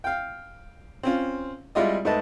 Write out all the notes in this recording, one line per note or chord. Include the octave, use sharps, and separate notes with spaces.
F5 G5
C4 C#4 F4
G3 G#3 E4 F4 D5 D#5
G#2 A3 B4 D#5 A5